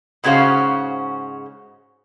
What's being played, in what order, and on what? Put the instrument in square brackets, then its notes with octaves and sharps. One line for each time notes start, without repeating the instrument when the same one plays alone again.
[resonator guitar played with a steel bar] G#2 C#3 C#4 F#4 C5 F5